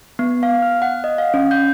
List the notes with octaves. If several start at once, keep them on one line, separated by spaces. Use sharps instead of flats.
B3
F5
F6
F#5
D#5
F5
C#4
G6